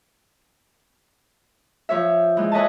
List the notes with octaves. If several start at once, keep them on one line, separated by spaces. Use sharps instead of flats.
F3 C#5 E5
E3 G#3
B4 C#5 D#5 E5 G#5 A5